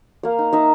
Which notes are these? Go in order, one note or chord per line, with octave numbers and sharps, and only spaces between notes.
A#3 F5
D#4
D#4 E5